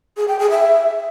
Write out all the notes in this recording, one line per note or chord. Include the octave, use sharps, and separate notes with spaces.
G#4
G5
G#4
E5